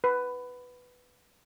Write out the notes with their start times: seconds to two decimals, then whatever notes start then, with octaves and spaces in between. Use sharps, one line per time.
0.04 B4